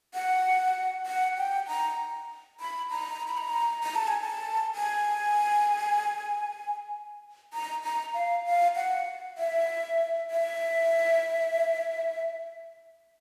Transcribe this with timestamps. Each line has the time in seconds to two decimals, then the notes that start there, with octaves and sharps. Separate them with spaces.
0.15 F#5
1.06 F#5
1.38 G5
1.68 A#5
2.60 B5
2.91 A#5
3.27 B5
3.37 A#5
3.83 A#5
3.95 A5
4.08 G#5
4.21 A5
4.75 G#5
7.53 A#5
7.84 A#5
8.14 F5
8.46 F5
8.76 F#5
9.38 E5
10.31 E5